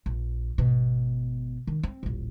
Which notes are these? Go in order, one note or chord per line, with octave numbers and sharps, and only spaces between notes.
A#1
G#1 B2
D#3
C4
D#1 A1